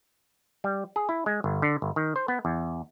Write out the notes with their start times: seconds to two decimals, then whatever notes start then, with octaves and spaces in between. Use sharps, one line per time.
0.64 G3
0.96 G#4
1.09 E4
1.26 G#3
1.44 G1
1.62 D3
1.82 G1
1.96 D#3
2.16 C5
2.28 B3
2.45 E2